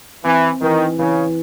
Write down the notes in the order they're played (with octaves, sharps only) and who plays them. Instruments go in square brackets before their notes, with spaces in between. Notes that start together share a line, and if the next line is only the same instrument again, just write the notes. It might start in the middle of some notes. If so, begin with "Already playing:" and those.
[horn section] E3 [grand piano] C4
[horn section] D#3 [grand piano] E3
[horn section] C#3 [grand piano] E3